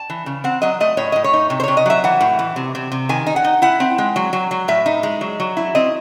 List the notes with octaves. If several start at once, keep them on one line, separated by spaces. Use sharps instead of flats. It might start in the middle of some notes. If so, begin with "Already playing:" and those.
Already playing: A5
E3
C#3
C4 F#5
F#3 D#5
A3 D#5
A2 C#5
A2 D#5
C#5
D#4
C3
C5
C3 C#5
D#5
F#3 E5
E3 F#5
A2
E3
C3
C3
C3
D#3 G#5
D#4
F#5
D#4
E4 F#5
C4
G#3
F#3
F#3
F#3
A2 E5
D#4
G#3
F#3
F#3
E4
C4 D#5